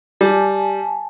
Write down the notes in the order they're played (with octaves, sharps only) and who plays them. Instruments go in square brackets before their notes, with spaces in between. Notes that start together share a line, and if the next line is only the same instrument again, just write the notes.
[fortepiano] G3 [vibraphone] G#5 A5